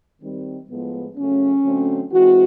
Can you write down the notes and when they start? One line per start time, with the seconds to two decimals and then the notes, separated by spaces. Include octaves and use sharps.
0.22 D#3 G3 C4
0.70 A2 F3 G#3 B3
1.16 C#3 F#3 A3 C#4
1.64 D3 F#3 A3 C4
2.12 E3 G#3 C4 F#4